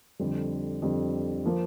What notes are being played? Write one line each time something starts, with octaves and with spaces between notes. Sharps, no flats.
F2 D3 G3
F2 D3 G3
F3 A#3